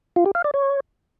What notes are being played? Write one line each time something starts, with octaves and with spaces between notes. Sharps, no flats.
F4
G4
F5
D5
C#5